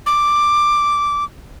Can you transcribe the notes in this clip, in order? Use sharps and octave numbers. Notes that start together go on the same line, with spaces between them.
D6